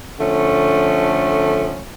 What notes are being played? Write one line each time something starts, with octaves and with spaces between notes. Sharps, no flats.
D3 F3 A3 C#4